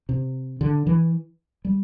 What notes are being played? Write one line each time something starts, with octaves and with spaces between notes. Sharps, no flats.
C3
D3
E3
G3